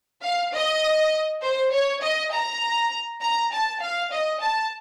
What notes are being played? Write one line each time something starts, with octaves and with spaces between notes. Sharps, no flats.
F5
D#5
C5
C#5
D#5
A#5
A#5
A5
F5
D#5
A5